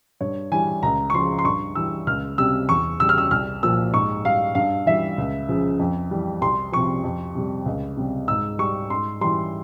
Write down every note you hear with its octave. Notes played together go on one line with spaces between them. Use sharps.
G2 C#5
E3 G3 G#5
C#2 A#5
C#6
C#3 F3 C6
C6
G2 C#6
E3 G3 E6
C#2 F6
C3 G3 E6
E2 C#6
C#3 G3 E6
F6
E6
C2 F6
A#2 F3 E6
G#2 C#6
G3 F5
G2 F5
E3 G3 E5
C#2
C#3 F3
F2
E3 G3
C2 C6
C3 F3 C#6
F2
C3 G3
C#2
C3 G3
G#2 E6
G3 C#6
G#2 C6
E3 G3 C6